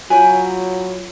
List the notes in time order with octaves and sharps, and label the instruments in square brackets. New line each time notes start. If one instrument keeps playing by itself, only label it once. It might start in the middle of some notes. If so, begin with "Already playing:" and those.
[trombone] F#3 [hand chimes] F4 C#5 [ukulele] G#5